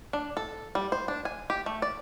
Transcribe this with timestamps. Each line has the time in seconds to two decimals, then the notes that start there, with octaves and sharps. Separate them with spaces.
0.13 D4
0.37 A4
0.75 G3
0.92 C5
1.08 D4
1.25 G#5
1.50 G4
1.66 A3
1.82 D5